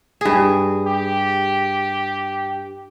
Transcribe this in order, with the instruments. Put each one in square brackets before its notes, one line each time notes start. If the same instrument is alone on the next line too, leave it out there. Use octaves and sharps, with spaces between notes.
[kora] G2 G#4
[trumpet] G4